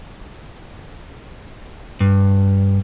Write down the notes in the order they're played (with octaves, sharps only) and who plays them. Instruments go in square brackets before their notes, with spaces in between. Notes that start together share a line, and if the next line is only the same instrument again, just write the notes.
[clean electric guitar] G2